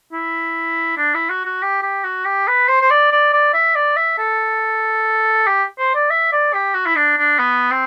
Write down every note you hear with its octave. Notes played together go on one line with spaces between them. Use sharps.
E4
D4
E4
F#4
F#4
G4
G4
F#4
G4
B4
C5
C5
D5
D5
D5
E5
D5
E5
A4
G4
C5
D5
E5
D5
G4
F#4
E4
D4
D4
B3
C4